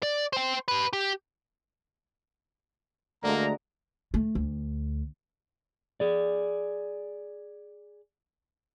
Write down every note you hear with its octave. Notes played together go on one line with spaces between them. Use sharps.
D5
C5 G5
G4 B4
G4
D2 D3 G#3 A#3 A#5
A3
D2
G#4 D5